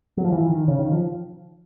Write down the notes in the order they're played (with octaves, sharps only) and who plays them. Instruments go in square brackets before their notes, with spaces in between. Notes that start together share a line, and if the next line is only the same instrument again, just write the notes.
[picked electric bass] F#3
F3
E3
D#3
C#3
D#3
F3